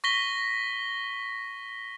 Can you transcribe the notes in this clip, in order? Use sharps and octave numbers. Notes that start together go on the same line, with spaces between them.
C#6 A#6 B6 G7